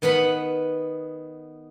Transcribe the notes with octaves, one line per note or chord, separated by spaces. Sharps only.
D#3 B3 F#5 B5